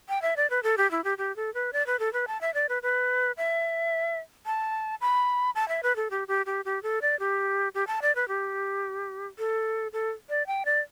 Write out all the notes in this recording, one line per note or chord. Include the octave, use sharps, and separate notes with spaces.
G5
E5
D5
B4
A4
G4
E4
G4
G4
A4
B4
D5
B4
A4
B4
A5
E5
D5
B4
B4
E5
A5
B5
A5
E5
B4
A4
G4
G4
G4
G4
A4
D5
G4
G4
A5
D5
B4
G4
A4
A4
D5
G5
D5